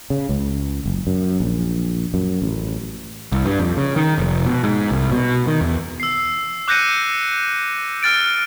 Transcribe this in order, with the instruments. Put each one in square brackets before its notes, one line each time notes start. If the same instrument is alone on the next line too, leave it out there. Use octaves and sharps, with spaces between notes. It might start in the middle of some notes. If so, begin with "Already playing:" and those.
[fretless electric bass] C#3
C#2
F#1
F#2
A#1
F#2
A1
[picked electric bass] C2
G2
F2
C#3
D#3
F1
B2
G#2
C2
B2
D#3
E2
[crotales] E6 C7
D6 F#6 G6 A#6 C#7 D#7
F6 A6 D7